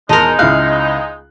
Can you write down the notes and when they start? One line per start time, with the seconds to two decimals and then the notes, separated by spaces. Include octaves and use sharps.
0.09 E1 G#3 D#4 A#4 D#5 A5 C6
0.39 C#2 E4 F5 F#6